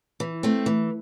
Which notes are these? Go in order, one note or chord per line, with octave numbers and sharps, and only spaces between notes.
E3
A3 C4
E3